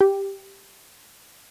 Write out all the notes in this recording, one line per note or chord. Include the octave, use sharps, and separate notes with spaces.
G4